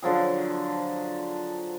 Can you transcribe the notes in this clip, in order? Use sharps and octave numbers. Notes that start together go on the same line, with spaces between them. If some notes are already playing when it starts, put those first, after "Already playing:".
D3 F3 F#3 G#4